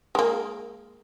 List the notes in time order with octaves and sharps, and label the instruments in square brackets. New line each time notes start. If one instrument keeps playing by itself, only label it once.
[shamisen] G#3 A#3